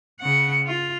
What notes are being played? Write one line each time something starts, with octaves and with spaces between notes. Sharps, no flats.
C#3 F#5
F4